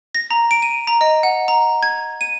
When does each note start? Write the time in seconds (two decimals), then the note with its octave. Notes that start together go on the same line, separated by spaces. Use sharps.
0.15 A#6
0.31 A#5
0.51 D7
0.62 D#7
0.87 A#5
1.01 D#5
1.23 F#5
1.48 A#5
1.83 G#6
2.21 D#7